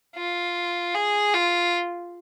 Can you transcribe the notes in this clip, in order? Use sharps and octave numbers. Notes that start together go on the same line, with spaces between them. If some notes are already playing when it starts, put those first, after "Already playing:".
F4
G#4
F4